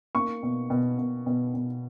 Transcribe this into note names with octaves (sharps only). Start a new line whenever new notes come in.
A#3 C#6
B2
B2
B2
B2
B2